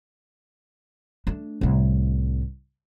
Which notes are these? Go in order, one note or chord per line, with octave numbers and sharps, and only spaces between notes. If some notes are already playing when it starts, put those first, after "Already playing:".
A3 D4
C2 A2